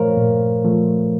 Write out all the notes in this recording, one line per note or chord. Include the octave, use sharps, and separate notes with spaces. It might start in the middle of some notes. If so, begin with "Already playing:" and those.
Already playing: A#2 F3 A3 A#4 C5 C#5 F5
A#2
F3 A3